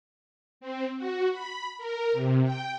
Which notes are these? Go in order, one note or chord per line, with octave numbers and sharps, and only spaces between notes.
C4
F#4
B5
A#4
C3
G5